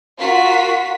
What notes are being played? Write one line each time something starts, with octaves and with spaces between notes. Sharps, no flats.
F4 F#4 A#4 B6